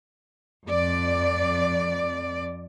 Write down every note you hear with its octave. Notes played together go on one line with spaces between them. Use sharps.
F2 D5